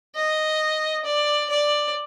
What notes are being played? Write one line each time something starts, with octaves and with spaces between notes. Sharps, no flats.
D#5
D5
D5